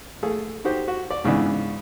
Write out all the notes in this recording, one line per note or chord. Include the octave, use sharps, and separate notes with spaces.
A3 G#4 A4
D#4 F#4 G4 C5
F#4
D5
G#2 C#3 E3 B3 D4